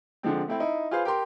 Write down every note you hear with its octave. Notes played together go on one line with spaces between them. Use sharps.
D3 F3 G#3 C4
A3 C4 E4
D#4 E4
F4 G#4 B4 C5 F5
G4 A#4 C6